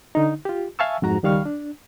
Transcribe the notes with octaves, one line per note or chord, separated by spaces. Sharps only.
D3 D#4
F4 G4
E5 F5 G#5 A5 C#6 E6
F2 G#2 F#4 A#5
C#2 D#3 G3 F5 C#6 F6
D4